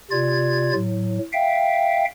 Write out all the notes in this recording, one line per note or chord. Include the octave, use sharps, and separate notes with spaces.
C3 F4 D5 G#6
A2 F#3
E5 F5 G5